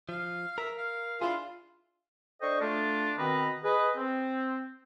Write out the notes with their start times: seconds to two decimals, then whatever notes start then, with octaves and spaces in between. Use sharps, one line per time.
0.09 F3 F5
0.58 A#4 E5
0.78 F5
1.21 D4 E4 F4 G#4
2.41 D4 A4 C5 D#5 G5 C#6
2.61 A3 D4 F4
3.18 B2 D#3 C4 B4 D#5 A#5
3.64 G#4 B4 D#5
3.96 C4